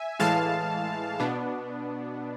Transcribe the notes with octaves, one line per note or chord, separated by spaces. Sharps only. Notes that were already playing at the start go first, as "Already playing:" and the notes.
Already playing: E5 G#5
A2 E3 G#3 F5 A5
B2 B3 D4